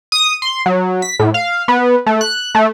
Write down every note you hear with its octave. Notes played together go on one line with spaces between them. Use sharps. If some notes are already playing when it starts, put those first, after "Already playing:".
D#6
C6
F#3
B6
A2
F5
B3
A3
F#6
A3